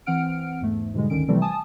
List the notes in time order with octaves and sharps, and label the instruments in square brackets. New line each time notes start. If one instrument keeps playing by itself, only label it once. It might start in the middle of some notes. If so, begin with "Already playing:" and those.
[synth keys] E3 C4 F#5 F6 D7
E2 G#2 A3
G#2 B2 D3 G3 G#3
G1 D2 D3 D#3 C#4 D7
C3 E3 F3 G3 A3 C4
G#5 A5 D#6